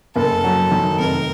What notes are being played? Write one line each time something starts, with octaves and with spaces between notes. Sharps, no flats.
F#1 A4
F#3
D#3
F1 A#4